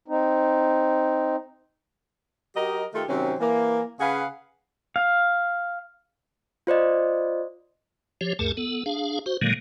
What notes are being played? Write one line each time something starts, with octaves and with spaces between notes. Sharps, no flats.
C4 D#4
F#3 G4 A#4 D#5
D#3 A3 F4 G4 A4
C3 D#3 F#3 C4 C#4
E3 A#3
C#3 G#4 B4 F5 F#5
F5
F4 C5 D5 D#5
F3 G4 C#5
D2 G2 A3 G#4 A#4 A5
B3 A4
D4 G#4 F5
F#4 C5
A#2 D3 D#3 F#3 G#3 A#3